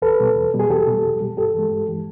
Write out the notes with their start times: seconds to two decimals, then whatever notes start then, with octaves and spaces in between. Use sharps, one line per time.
0.02 E2 A4 B4
0.20 B2 G3
0.36 E2
0.54 B2 G3
0.60 G#4
0.69 E2 G4 A4
0.87 B2 G3
1.03 E2
1.21 B2 G3
1.37 G2 G4 A4
1.54 E3 G#3
1.71 G2
1.88 E3 G#3